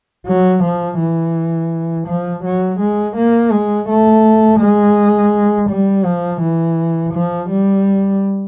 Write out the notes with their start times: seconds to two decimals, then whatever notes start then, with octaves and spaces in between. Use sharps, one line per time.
0.26 F#3
0.64 F3
0.99 E3
2.07 F3
2.44 F#3
2.80 G#3
3.16 A#3
3.52 G#3
3.88 A3
4.60 G#3
5.69 G3
6.05 F3
6.41 E3
7.13 F3
7.50 G3